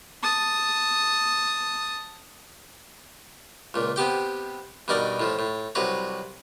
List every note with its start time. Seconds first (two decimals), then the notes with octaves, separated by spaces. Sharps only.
0.23 A5 D#6
3.74 C#2 A#2
3.96 C3 B3 G4 G5
4.88 G2 B2 D#4 A#4 D5 A#5
5.20 A2 F3
5.39 A2
5.75 C2 C3 F#3 B4 A#5